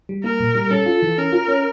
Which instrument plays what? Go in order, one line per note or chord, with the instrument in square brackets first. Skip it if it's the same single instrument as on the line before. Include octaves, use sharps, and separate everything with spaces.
[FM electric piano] G3
[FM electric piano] A#3 [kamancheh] A#4
[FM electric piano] A#2
G3
[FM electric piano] C#4 [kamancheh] A4
[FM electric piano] F4
E3
[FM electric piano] C#4 [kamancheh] A#4
[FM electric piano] F4
C#4